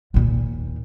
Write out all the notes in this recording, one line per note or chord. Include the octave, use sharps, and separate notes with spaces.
D#2 A#2